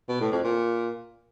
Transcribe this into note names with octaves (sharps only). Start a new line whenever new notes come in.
B2
A2
F2
A#2